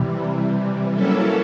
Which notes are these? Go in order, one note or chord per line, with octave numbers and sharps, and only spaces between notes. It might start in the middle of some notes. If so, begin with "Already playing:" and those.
Already playing: C3 E3 G3
F#3 A#3 C#4 E4 A4